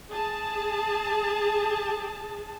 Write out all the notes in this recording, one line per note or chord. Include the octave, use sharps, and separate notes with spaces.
G#4 A5